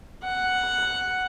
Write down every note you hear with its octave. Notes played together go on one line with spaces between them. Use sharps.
F#5